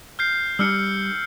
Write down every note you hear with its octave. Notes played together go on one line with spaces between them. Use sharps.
F6 G6 C7
G3 D4 E6 F6 C#7